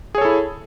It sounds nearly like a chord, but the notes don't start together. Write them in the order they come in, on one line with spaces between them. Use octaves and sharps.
G#4 C#5 A4 E4